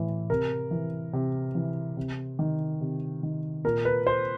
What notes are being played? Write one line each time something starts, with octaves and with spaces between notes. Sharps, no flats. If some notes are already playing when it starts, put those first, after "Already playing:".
Already playing: A2 E3
C3 A#4
E3
C3
E3
C3
D#3
C3
D#3
A#2 A#4
B4
C5